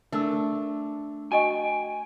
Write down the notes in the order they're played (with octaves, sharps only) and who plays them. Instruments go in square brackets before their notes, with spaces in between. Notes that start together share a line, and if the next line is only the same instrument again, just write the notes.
[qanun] A3 D4 [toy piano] A#4 E6
[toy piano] F#4 D#5 C#6 [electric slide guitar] G5 G#5